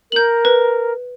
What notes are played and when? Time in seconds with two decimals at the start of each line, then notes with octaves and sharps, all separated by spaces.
0.12 A#4 G6 F#7
0.45 B4